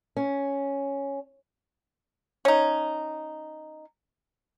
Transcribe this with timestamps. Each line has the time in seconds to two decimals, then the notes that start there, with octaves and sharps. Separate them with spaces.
0.17 C#4
2.45 C#4 D#4